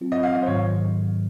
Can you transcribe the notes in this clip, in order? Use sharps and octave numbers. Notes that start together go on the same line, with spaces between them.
F#3 C4 F4
D#5
F5
D#5
C5
G#2 D#3 F#3 C#5